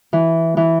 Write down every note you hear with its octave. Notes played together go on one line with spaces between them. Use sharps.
E3
E3